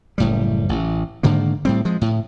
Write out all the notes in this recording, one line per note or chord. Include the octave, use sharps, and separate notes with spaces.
F#1 A2 G3
A1
G#2 D3 D#3 A#3
A2 G3 C4
F3 G#3
A2